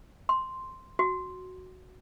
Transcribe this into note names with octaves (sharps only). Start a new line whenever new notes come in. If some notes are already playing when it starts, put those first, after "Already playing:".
C6
F#4